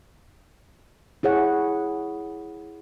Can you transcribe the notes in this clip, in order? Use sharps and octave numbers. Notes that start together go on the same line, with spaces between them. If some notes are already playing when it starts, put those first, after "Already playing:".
E4 G#4 C#5 F#5